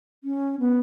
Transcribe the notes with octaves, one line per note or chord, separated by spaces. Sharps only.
C#4
B3